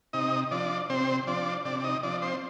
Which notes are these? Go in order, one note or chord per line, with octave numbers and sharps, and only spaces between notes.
C3 D#4 D#5
F3 D4 D5
C3 C4 C5
F3 D4 D5
C3 D4 D5
D5
D#4 D#5
F3 D4 D5
C4 C5